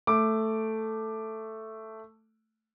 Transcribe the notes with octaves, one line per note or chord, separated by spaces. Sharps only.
A3 D6